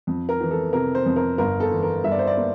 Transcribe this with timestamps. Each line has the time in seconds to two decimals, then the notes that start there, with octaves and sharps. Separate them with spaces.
0.07 F2
0.29 A#4
0.40 E3
0.51 A4
0.73 C3 A#4
0.95 C5
1.06 F2
1.16 A#4
1.38 G1 A#4
1.60 A4
1.71 E3
1.83 A#4
2.04 G2 E5
2.12 D5
2.19 C5
2.27 D5
2.37 A#3